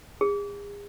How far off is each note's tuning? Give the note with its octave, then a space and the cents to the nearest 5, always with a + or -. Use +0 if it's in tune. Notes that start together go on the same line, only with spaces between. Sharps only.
G#4 -40